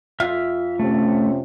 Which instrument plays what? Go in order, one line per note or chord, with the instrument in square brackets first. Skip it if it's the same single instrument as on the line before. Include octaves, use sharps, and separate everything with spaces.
[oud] F2 F4 [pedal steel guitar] E5 F6
[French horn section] C3 C#4 [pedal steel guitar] A3